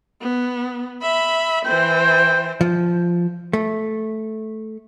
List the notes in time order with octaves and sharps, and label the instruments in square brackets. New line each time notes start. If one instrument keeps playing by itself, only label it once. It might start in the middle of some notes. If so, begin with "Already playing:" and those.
[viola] B3
E5 B5
[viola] E3 C5 [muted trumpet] G5
[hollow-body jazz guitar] F3
A3